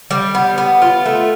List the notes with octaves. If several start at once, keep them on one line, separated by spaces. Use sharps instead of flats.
G3
B3
B3
F4
A3